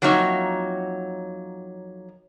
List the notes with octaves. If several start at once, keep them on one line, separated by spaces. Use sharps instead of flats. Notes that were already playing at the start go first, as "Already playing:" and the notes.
F2 F#3 A#3 D#4 C#5 E5